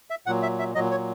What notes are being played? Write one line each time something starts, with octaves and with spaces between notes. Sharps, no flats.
E5
A#2 F#3 F#5
E5
E5
A#2 F#3 D#5
C#5